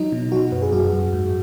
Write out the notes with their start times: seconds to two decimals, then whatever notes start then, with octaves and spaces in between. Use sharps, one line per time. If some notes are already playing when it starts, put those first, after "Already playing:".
Already playing: F#3 D#4
0.12 B2
0.32 F#3 F#4
0.52 F#2 B4
0.62 G#4
0.72 F#2 F#4
0.93 F#2
1.13 G#2